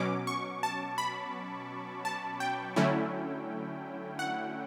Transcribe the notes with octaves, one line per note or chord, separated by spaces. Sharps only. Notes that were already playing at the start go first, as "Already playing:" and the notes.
Already playing: B2 F#3 C#4 D6
C#6
A5
B5
A5
G5
D3 F#3 A3 C#4 E4
F#5